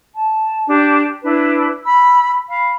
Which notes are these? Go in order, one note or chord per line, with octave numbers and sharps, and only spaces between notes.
A5
D4 G4
D4 E4 B4
B5 E6
F5 B5